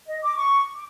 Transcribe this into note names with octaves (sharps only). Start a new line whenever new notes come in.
D#5
D6
C#6
D6